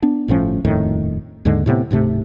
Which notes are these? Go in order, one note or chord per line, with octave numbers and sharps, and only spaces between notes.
B3 D4
G1 A2 F3 C#4
D#1 F2 A2 D#3
D#2 G#2 D3 G#3
A2 C3 D#3 B3
D1 G#2 C3 A3